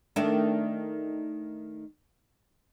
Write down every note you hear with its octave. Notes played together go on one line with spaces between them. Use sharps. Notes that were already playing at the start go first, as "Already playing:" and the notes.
D#3 A3 D4